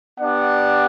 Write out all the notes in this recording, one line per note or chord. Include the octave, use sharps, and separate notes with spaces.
B3 D4 G4 D5 F#5